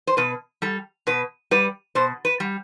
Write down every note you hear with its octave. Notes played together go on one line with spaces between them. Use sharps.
C5
B2 B4
G3 A4
B2 B4
G3 B4
B2 C5
B4
G3